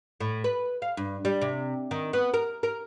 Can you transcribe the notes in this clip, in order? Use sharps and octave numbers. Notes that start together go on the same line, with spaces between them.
A2
B4
F5
G2
G3
C3
D#3
B3
A#4
A#4